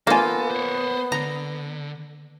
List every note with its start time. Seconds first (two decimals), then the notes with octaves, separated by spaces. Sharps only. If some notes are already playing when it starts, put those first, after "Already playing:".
0.07 F3 A#3 B3 F4 A4 G#5
0.51 C5 C#5
1.12 D3 A#5